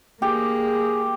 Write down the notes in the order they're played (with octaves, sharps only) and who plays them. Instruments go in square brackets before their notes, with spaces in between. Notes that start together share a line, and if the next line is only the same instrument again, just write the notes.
[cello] A#3 [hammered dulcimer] G4 [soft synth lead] G#4